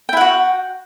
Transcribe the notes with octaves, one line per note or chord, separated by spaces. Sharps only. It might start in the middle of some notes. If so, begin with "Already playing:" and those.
E4 F#4 F#5 G5